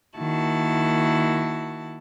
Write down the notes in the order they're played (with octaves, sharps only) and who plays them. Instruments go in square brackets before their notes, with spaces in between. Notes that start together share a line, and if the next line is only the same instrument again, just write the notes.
[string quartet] D#3 A#3 E4 F#4 A5